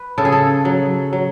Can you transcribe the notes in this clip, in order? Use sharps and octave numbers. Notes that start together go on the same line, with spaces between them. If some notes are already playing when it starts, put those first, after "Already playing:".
Already playing: B4
C#3 A4
G#4
A4
F#3
F#3